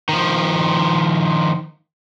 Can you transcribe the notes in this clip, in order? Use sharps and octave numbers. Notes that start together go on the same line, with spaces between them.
D#3 F3